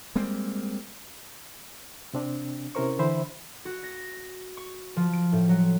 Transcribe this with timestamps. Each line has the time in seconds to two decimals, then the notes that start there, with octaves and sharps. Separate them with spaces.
0.16 G3 G#3 A#3 C4
2.14 C3 C4 D4
2.75 C3 C#4 E4 A#4 C5 C#6
2.99 D3 E3 C5 E5 B5
3.65 F#4
3.83 A#6
4.57 C#6
4.96 F3
5.13 D7
5.32 A2
5.49 F#3